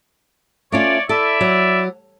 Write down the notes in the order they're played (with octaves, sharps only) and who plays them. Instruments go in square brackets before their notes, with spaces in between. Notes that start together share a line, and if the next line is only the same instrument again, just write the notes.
[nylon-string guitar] A3 C#4 F4 [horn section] C#5 D5
[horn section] E4 D5 E5 [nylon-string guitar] A4
[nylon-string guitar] F#3